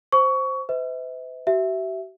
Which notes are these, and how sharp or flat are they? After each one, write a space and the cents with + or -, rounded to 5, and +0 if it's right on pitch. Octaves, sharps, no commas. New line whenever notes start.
C5 +0 C#6 +20
B4 +45 E5 -40
F#4 +45 E5 +0